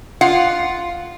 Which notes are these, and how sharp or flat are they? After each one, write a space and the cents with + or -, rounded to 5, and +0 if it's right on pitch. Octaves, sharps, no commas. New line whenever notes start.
F4 +0 F#5 +0